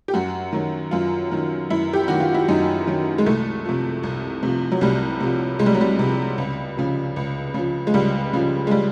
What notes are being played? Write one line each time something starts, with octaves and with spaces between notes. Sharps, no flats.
G4
F#2 F#4
D#3 F#3
F#2 F4
D#3 F#3
F#2 E4
G4
D#3 F#3 F#4
F4
E4
F#2 D#4
D#3 F#3
G#3
C2 A3
C3 F3
C2
C3 F3
F#3
C2 G3
C3 F3
C2 G#3
G3
F#3
G3
C3 F3
C#2
C#3 F3
C#2
C#3 F3
G#3
C#2 G3
C#3 F3
G#3
G3